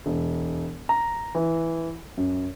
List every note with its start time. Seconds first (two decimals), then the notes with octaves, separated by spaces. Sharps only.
0.06 E1
0.89 A#5
1.35 E3
2.17 F#2